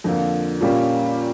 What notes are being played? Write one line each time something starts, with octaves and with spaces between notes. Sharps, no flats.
F2 D3 F3 A#3
A#2 G3 A#3 C#4 G4